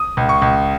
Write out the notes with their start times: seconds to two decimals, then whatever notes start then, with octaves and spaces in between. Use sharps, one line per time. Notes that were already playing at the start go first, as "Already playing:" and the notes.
Already playing: D#6
0.17 C#2
0.29 C#6
0.42 C#2